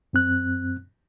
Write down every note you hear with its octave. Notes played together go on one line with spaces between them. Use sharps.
F#2 C4 F#6